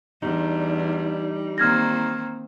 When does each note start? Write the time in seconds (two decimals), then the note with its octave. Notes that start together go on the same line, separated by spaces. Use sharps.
0.22 E2 G3 D4 D#4
1.58 D#3 A#3 C4 F6 G#6 A#6